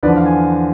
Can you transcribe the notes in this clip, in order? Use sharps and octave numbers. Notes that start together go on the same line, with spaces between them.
E2 D3 F3 B4 D5
F5
G#5